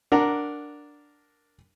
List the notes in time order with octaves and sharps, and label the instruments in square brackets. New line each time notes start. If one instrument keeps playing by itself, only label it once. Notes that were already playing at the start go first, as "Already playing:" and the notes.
[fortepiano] D4 A#4 F#5 A#5